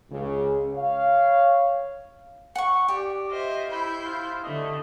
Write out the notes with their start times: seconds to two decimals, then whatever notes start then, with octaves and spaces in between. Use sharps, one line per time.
0.11 C#2 C#3
0.75 C#5 F5
2.55 F#5 C#6
2.88 G4 D5
3.30 F4 C5 D#5 E5
3.70 E4 C5 B5 G6
4.05 F4
4.43 D3 A3 D#5